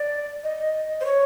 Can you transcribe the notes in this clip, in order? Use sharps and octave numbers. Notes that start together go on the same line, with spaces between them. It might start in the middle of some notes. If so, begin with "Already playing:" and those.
Already playing: D5
D#5
C5
C#5